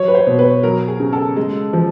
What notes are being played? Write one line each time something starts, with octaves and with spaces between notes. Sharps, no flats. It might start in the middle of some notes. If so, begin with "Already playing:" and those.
Already playing: F#3 C#5
B4
C5
B2
B4
F#3 A#4
G#4
C#3
A4
G#3
F3